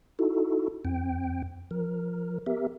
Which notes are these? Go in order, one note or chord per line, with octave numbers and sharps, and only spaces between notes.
D#4 E4 F#4 A4
F2 C4 G5
F3 A#4
B3 G4 A#4 E5